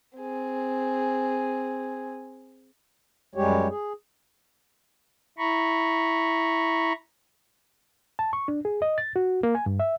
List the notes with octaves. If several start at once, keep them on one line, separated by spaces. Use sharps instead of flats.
C4 G#4
F#2 G3 G#3 G4 C#5
G#4
E4 A#5 B5 C#6
A5
C#6
D4
G#4
D#5
A6
F#4
A#3
G#5
G2
E5